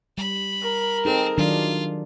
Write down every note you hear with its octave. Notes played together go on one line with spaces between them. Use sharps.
G3 B5
A#4
C4 D#4 G#4 A4
D#3 F#3 D4 F4